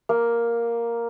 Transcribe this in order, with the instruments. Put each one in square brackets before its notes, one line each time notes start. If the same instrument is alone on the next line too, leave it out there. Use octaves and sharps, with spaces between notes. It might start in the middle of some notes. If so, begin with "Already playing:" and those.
[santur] A#3